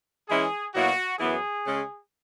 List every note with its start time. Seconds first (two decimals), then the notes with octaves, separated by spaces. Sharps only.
0.29 E3 G#3 C#4 E4 G#4
0.73 B2 F#3 A#3 E4 F#4
1.19 F#2 E3 B3 E4 G#4
1.64 C#3 G#3 C#4